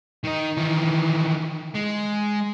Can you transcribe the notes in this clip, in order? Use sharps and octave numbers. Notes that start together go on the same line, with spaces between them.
D#3 D#4
D#3 E3
G#3